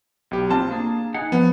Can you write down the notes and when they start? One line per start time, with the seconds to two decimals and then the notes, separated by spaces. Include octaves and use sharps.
0.31 B1 G4
0.51 C4 F4 A5
0.71 A#3 D4 G#4
1.14 D#4 G#4 F#5
1.32 F3 B3